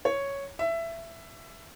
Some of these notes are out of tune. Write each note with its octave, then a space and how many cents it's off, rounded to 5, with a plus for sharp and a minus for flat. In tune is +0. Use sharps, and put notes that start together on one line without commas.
C#5 +0
E5 +15